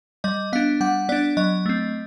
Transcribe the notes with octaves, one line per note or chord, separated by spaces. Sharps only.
G3 D#5
B3 D4 F5
G3 F#5
B3 D4 D5
F#3 D#5
A3 C4